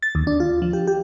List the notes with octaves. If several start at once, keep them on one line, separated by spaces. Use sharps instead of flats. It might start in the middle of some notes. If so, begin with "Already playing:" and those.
A6
D#2
D4
F4
F3
G4
G4